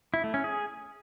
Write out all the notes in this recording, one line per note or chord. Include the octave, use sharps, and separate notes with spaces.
E4
A3
C#4
G#4